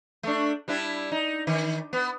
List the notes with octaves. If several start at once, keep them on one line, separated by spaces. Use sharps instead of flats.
A3 D4
G3 D4 E4
D#4
D#3
B3